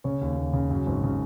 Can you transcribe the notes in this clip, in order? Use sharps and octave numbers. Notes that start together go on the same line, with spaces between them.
C#3 C#5
D#2
D#2
C#3
F#2
G#1
C#3